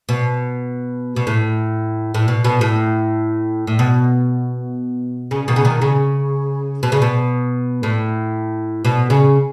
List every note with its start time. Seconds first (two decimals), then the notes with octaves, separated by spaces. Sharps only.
0.09 B2
1.16 B2
1.27 A2
2.14 A2
2.28 B2
2.44 B2
2.61 A2
3.67 A2
3.79 B2
5.31 C#3
5.48 B2 D#3
5.56 C#3
5.65 B2 D#3
5.81 C#3
6.83 B2
6.92 C#3
7.02 B2
7.83 A2
8.85 B2
9.10 C#3